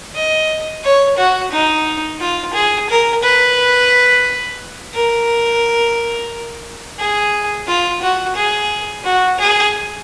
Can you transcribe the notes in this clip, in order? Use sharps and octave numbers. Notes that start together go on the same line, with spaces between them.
D#5
C#5
F#4
D#4
F4
G#4
A#4
B4
A#4
G#4
F4
F#4
G#4
F#4
G#4